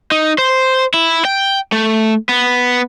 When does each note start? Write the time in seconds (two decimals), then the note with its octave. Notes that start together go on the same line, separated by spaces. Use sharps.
0.11 D#4
0.38 C5
0.94 E4
1.25 G5
1.72 A3
2.29 B3